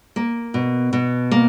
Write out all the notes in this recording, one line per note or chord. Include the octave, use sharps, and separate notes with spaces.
A#3
B2
B2
A#3